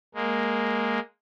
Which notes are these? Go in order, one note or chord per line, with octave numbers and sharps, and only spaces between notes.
G#3 A#3